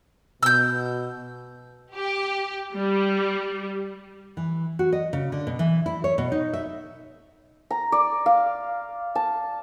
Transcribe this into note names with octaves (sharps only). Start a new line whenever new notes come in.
B2 E6 G6
G4
G3
E3
F#4
D#5
C#3
D3
B2
E3
E4
C#5
B2
D#4
E5
A#5
D5
F5
A5